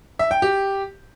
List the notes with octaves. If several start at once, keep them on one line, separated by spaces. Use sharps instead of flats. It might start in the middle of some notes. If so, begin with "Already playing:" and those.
E5
G5
G4